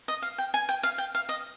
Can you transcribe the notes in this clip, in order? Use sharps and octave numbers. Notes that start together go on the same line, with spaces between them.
D#5
F5
G5
G#5
G5
F5
G5
F5
D#5